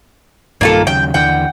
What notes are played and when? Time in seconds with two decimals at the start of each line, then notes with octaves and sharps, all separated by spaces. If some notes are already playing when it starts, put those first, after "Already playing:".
0.61 B1 G2 D#3 A#3 F4 A4
0.87 D#2 C#3 F#3 G5
1.14 D#2 D3 E3 F#5 G5